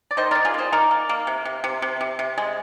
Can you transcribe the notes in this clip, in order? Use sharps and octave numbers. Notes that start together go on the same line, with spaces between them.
D5
D#3 C5 D#5
D#3 A#4 D5
F4 G#4
A#3 C5 D#5
D#4 A#4 D5
A#3
A#3
C3
C3
C3
C3
C3
C3
G#3